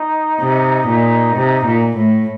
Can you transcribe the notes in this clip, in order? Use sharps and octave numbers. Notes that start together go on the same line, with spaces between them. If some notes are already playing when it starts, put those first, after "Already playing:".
Already playing: D#4
C3
A#2
C3
A#2
A2